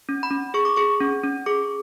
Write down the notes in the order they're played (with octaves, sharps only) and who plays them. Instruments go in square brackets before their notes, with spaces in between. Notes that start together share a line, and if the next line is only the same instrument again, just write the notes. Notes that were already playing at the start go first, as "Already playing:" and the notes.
[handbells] C#4
B5
C#4
G#4 C#6
D6
G#4 C#6
C#4
C#4
G#4 D6